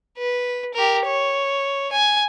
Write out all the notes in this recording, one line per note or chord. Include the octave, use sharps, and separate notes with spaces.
B4
G4 A#4
C#5
G#5